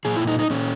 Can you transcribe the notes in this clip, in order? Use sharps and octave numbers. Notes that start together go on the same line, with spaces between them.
A#2 G#4
E4
D#4
D#4
A#2 C#4